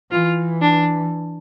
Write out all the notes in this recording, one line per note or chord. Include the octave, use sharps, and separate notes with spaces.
E3 F4
D4